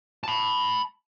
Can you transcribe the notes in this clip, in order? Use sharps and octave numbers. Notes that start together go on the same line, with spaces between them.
A5 B5